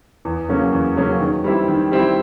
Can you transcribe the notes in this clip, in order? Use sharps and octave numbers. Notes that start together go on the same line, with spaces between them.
E2
C#3 F#3 A#3 C#4
E2
C#3 F#3 A#3 C#4
D#3
G3 C4 E4
D#3
G3 C4 E4